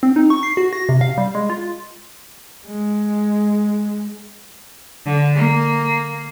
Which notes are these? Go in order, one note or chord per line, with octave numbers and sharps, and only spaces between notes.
C4
D#4
C#6
C7
F#4
A#6
C3
F5
G3
G#3
F4
G#3
D3
A#3